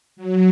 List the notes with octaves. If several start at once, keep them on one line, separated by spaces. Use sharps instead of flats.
F#3